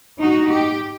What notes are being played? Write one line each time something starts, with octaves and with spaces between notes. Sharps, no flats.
D#4 F#4
G4